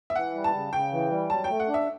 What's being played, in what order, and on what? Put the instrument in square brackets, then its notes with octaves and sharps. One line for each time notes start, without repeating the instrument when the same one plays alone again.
[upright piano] E5
[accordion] E3 [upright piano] F#5
[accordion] G3
[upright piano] A5
[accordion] C#3
[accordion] C#3 [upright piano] G5
[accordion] E3
G3
[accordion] F#3 [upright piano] A5
[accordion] A3 [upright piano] G5
[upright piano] F#5
[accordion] D4
[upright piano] E5